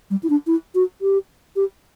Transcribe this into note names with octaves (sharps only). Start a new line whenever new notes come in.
G3
E4
D4
E4
F#4
G4
G4